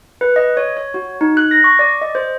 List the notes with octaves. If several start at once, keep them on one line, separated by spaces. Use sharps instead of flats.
B4
D#5
C#5
C#5
F#4
D#4
F#6
A#6
C#6
D5
D#5
C5